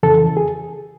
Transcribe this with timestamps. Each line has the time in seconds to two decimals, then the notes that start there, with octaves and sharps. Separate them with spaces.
0.03 F2 C#3 E3 A4
0.37 G#4